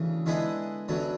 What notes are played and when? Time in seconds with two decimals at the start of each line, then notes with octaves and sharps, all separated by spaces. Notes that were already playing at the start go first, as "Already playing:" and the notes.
Already playing: D2 C#3 E3
0.26 D3 G#3 B3 E4 G#4
0.88 F#2 D3 F#3 B3